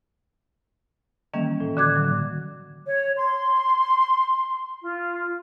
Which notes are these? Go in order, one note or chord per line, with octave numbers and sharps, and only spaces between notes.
D#3 E3 G3 A#3 C#4
A2
D3 F#4 D6 F#6 G#6
F#3
C#5
C6
F4